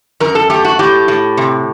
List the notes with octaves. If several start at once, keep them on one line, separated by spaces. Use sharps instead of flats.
F#2 A#4
A4
A3 G4
F#4
A2 G4
A2
C3